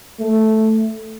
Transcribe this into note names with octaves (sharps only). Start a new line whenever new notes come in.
A3